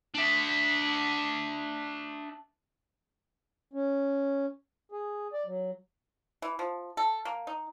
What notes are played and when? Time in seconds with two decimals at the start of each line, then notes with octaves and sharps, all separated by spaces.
0.15 D4 E5
3.73 C#4
4.92 G#4
5.33 D5
5.46 F#3
6.42 E3
6.59 F3
6.97 A4
7.25 A#3
7.47 D#4